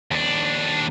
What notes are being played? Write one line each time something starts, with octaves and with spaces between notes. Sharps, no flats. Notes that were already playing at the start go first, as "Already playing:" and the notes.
D#2 D4